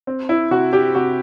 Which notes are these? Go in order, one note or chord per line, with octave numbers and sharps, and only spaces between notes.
C4
E4
C3 F#4
G4
C3 F#4